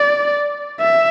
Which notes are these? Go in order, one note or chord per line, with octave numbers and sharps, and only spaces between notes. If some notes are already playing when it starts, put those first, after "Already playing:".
Already playing: D5
E5